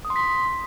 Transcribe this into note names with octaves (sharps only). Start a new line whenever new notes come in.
D#6
C6
B6